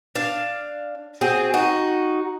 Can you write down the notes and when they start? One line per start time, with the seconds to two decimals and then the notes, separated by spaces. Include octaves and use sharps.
0.16 D4 F5
1.21 C4 F#4 G#4
1.54 D#4 F#4